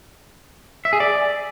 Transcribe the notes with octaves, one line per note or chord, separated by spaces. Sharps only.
E5
G#4
D5